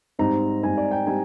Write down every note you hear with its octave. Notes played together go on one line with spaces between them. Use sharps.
G#2 G3 C4 D#4 A#5
G#2 G3 C4 D#4 G#5
D5
G5
G3 C4 D#4 G#5